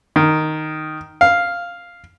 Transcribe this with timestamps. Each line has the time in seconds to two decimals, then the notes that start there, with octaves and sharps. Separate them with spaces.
0.16 D#3
1.21 F5